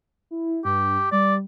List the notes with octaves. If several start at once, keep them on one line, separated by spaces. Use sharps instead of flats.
E4
G2 G4
G3 D5